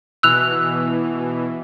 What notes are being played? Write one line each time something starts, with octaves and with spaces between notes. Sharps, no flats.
B2 E3 E6 F#6 F7